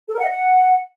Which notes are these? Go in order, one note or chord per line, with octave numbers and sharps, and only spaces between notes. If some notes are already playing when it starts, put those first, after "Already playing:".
A4
A#4
F#5
D#5
F#5